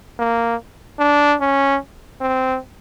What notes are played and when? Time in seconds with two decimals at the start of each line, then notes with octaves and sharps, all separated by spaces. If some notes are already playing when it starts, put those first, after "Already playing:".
0.19 A#3
0.99 D4
1.41 C#4
2.21 C4